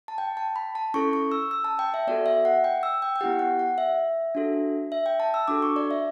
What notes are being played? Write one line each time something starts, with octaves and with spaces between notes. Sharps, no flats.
A5
G5
A5
B5
A5
C#4 E4 A4 C#6
C#6
E6
E6
A5
G5
E5
B3 F#4 A4 D5
E5
F#5
G5
E6
G5
G5
B3 E4 G4 F#5
F#5
F#5
E5
D4 F#4 A4
E5
G5
A5
E6
D4 F#4 A4 D6
C#6
D5
E5